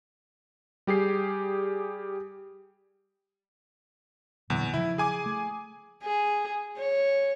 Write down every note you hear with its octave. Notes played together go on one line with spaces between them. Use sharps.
G3 G4 G#4 C7
E2 A#2 D3 F#3
C#3 F3 E4
G#4 G#5 D6
A3
G#4
C#5